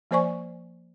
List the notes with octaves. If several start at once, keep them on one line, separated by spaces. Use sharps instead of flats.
F3 A#3 C5 D5 G#5 C#6